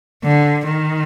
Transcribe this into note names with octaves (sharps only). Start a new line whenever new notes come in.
D3
D#3